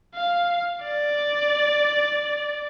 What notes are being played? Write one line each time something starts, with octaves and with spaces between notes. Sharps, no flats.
F5
D5